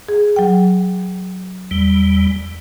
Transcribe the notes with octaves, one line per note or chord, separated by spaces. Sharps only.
G#4
F#3 G5
E2 G3